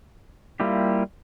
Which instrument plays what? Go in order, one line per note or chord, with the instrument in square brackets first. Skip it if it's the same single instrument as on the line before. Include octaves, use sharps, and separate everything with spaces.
[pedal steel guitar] G3 A#3 E4 F4 G4